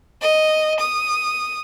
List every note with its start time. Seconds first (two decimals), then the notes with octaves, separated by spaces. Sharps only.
0.22 D#5
0.80 D#6